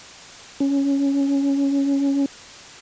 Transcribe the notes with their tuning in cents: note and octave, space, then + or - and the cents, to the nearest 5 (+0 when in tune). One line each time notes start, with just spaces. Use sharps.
C#4 +5